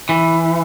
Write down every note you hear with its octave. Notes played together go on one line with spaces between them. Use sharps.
E3